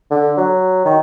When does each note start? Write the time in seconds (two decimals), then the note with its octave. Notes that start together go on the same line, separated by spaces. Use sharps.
0.11 D3
0.38 F#3
0.85 D#3